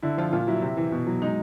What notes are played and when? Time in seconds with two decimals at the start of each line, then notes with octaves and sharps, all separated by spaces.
0.02 D3 E4
0.17 F3 F4
0.33 A#2 F4
0.47 F#3 E4
0.62 C3
0.77 E3
0.92 B2
1.07 F#3
1.22 G#3 D#4